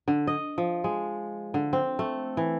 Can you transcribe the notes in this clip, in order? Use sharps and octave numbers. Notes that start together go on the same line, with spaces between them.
D3
D#5
F3
G#3
D3
C4
A3
E3